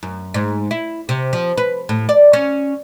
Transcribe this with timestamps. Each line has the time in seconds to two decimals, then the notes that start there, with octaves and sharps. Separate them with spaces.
0.03 F#2
0.34 G#2
0.71 E4
1.09 C3
1.33 F3
1.58 B4
1.89 A2
2.09 D5
2.33 C#4